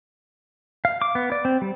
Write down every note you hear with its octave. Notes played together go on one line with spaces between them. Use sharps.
F5
D6
B3
D5
C4
G3